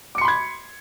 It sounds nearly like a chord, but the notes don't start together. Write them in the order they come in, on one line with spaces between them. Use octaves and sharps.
D6 C#7 C6 B5 G#6